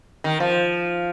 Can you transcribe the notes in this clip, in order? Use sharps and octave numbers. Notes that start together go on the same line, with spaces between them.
D#3
F3